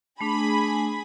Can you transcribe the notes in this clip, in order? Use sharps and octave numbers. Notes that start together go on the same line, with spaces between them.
A3 D4 G#4 B5